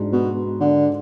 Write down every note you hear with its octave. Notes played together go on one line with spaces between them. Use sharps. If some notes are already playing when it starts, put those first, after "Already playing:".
Already playing: G#2 G#3 D4 F#4
B2
D3